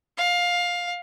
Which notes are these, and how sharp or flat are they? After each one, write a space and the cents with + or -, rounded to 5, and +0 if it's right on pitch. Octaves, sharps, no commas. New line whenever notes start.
F5 +15